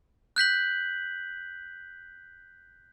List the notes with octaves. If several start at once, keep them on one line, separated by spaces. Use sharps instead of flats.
F#6 G6 B6 F#7